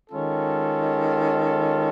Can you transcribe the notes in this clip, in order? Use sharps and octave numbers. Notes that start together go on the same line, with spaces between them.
D#3 G#3 C#4 F4 A4